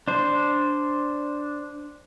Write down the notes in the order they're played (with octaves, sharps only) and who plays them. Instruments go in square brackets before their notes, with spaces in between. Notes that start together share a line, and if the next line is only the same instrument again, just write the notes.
[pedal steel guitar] D4 C5